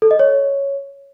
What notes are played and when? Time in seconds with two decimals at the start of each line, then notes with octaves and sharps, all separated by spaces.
0.02 A4
0.11 D#5
0.19 C#5